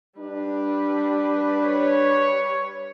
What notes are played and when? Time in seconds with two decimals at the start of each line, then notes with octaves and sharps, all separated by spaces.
0.19 G3 D4 B4
1.64 C#5